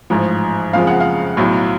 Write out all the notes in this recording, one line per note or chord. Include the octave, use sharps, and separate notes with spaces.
A1 G#2 F3
F#1 F2 C#3 F3 G#3 F5
F#5
F5
B1 A2 F#3